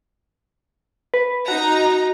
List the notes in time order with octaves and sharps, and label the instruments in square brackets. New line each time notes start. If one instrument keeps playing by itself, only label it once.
[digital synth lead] B4
[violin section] D#4 A#5 [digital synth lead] F#4